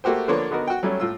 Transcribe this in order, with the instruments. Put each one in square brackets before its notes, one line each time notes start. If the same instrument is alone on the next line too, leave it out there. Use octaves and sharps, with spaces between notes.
[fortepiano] A3 A#3 F#4 G4 C5
D3 F3 A#3 D4 B4 C#5
D3 B3 D#4 F#4 A#4
F#4 G5
F#3 G3 A3 C#4
A2 F4 E6